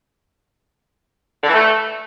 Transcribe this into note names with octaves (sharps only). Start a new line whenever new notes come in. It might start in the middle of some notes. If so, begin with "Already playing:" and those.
D3
E3
A3